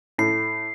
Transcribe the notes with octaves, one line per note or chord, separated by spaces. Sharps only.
A2 C7